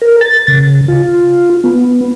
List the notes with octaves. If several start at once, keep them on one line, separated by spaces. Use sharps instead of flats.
A#4
A6
C#3
F4
B3